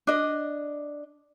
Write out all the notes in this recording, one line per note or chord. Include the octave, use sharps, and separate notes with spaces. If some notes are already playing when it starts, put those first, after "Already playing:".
D4 D#5